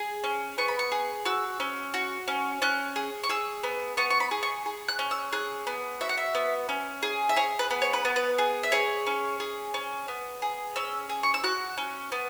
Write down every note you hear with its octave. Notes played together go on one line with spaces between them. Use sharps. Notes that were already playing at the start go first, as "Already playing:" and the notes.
Already playing: G#4
C#4
B3 C#6
B5
C#6
G#4
F#4 E6
C#4
F#4
C#4
C#4 F#6
G#4
C#6
G#4 E6
B3
B3 C#6
C#6
B5
G#4
C#6
G#4
F#6
C#4
E6
G#4 F#6
B3
F#4 E5
F#5
E5
B3
C#4
G#4
E5
G#4 C#5
B4
B3
C#5
B4
B3
B4
G#4
E5
G#4 C#5
C#4
G#4
C#4
B3
G#4
C#4 E6
G#4
C#6
E6
F#4 F#6
C#4
B3